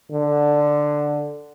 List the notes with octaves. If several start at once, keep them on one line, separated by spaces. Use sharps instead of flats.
D3